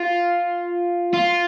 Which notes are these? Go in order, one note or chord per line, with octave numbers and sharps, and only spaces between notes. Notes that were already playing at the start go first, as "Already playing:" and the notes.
Already playing: F4
F4